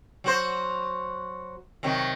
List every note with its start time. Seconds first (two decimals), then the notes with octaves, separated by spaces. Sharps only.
0.24 F#3 F#4 C5
1.83 C3 D#3 F#3